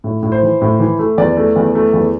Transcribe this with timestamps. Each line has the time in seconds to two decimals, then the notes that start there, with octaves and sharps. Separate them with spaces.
0.04 A2
0.23 A2
0.32 C5
0.43 E3
0.61 A2
0.79 E3
0.99 A3
1.18 E2 D5
1.37 A3
1.56 E2
1.75 A3
1.93 E2